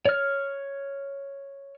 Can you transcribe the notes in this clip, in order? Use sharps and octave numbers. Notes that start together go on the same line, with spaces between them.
C#5 F6